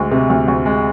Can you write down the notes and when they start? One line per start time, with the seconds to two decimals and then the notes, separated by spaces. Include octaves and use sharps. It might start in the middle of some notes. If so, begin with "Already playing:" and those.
Already playing: D2 G#3
0.11 C3
0.30 D2
0.48 D2
0.66 G#3